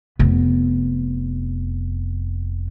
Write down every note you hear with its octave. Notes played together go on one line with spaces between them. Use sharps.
F1 B3